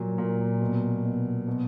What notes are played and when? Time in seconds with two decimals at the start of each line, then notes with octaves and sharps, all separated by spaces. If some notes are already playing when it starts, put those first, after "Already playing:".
Already playing: A#2 F#3
0.18 A#2
0.61 B2
1.04 B2
1.47 B2